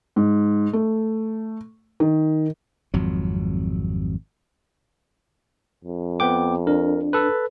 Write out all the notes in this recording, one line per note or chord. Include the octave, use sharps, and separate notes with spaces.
G#2
A3
D#3
G#1 F2 F#3
F2
B3 G5 D6
D4 A#4
A4 B4